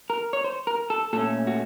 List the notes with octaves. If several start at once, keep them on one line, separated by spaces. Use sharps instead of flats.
A#4
C#5
C5
A#4
A4
A#2 A3 C#4 A4
F#4